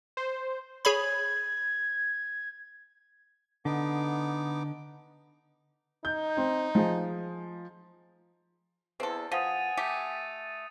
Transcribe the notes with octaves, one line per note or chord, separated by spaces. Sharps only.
C5
G#4 C#5 B5 G#6
D3 B3 D#4 D6
D#4 G6
C4
F3 G#4
E2 C4 A4
F3 F#5 G#5 D#6 A6 D#7
A3 G4